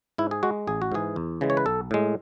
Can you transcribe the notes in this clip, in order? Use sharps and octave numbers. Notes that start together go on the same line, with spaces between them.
G#2 E4
G#4
G#3 F#4
A1 G#4
F#4
G#2 E3 G#4
E2
C#3 E3 G#3
C#5
B4
B1 A4
A2 G#3